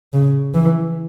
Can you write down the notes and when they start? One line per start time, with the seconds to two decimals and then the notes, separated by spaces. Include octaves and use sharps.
0.13 C#3
0.54 E3